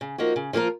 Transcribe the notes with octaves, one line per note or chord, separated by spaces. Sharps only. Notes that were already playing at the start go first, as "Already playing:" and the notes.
C#3
F3 A#3 D#4 F#4
C#3
F3 A#3 F4 A#4